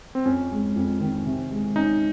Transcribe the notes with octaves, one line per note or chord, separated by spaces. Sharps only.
C4
F2 C#4
G#3
F2
D#3
C3
G#3
C#4 D#4